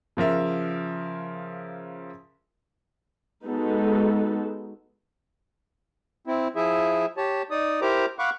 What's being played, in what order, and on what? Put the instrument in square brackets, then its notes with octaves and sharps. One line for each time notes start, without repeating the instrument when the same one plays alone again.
[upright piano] C#3 F3 A#4 E5
[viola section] G#3 B3 D#4 F#4 A4
[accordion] C4 E4
F3 E4 G#4 E5
G4 C#5 A5
D#4 D5 D#6
E4 G4 A#4 C5 A#5 D6
F5 F#5 B5 C#6 D6 F#6